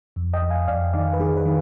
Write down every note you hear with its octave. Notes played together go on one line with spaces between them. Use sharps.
F2
D#5 G5
F2
F5 G#5
F2 D5 F5
D#3 D5 F5
B4
D#3 G#4
B4
D#3